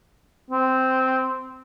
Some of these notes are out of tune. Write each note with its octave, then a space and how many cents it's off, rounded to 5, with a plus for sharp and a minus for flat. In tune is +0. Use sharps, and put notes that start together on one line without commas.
C4 -10